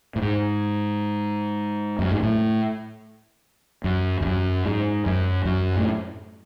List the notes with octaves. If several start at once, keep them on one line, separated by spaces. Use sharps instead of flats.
A2
G#2
F#2
G#2
A2
F#2
E2
F#2
G#2
F#2
F#2
A2